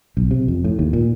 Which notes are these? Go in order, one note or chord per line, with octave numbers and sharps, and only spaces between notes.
B1
C3
F2
A2
D#2
A#2